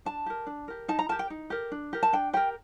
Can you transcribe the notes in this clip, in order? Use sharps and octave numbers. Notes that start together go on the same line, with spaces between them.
D4 A5
G4 A#4
D4
G4 A#4
D#4 A5
A#5
G4 A#4 A5
G5
D#4
G4 A#4
D4
G4 A#4
A5
D4 G5
G4 A#4 G5